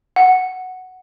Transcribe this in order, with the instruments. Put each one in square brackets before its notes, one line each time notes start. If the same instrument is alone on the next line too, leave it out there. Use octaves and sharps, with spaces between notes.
[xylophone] F#5